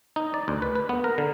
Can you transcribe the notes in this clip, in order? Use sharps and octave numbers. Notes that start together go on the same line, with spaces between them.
D#4
D5
D2
B4
B4
B3
A#4
D3